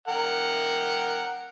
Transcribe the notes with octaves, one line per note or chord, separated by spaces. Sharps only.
A#4 F#5 G5